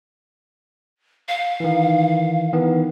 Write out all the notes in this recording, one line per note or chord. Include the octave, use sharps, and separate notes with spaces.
F5
D#3 E3
D#3 E3 B3